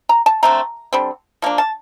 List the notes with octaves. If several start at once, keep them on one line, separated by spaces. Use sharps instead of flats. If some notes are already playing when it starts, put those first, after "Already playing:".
A#5
A5
D3 A3 C4 A#5
D3 G3 C4
F3 A#3 D4
A5